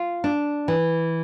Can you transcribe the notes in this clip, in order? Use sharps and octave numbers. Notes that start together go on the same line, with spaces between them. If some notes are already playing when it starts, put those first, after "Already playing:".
Already playing: F4
D4
E3